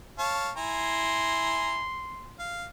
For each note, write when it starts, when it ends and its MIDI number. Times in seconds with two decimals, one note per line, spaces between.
0.19 0.50 73
0.19 0.50 77
0.19 0.50 81
0.57 1.84 64
0.57 1.84 80
0.57 1.84 82
0.57 2.38 84
2.39 2.66 77